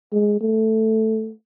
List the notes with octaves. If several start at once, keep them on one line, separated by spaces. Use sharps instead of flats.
G#3
A3